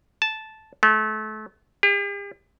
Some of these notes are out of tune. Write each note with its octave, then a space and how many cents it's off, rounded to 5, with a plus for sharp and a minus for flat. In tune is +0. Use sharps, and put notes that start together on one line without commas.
A5 -10
A3 -30
G4 +45